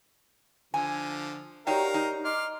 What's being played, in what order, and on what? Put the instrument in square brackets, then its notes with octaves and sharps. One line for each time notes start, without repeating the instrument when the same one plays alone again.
[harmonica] D3 F3 [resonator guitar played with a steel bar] G#5
[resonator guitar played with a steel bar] D#4 F#4 G5 [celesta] G4 C#5 D5 [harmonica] A#4 F5
[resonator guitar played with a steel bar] D#4
[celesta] D#5 [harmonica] C6 D6 F6